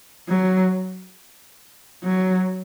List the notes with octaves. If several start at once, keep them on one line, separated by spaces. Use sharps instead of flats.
F#3
F#3